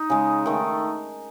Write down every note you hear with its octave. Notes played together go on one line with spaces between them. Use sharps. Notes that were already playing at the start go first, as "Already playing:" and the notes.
Already playing: D#4
C#3 G#3
D#3 A3